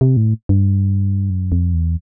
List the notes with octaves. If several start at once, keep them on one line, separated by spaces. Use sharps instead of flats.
C3
A2
G2
F#2
F2
E2